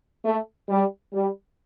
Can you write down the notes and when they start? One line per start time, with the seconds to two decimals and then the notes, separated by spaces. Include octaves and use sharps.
0.24 A3
0.69 G3
1.13 G3